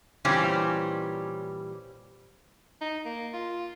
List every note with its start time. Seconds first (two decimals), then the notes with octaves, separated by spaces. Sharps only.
0.25 A#2 E3 G3 C4 C#4
2.81 D#4
3.05 A#3
3.33 F4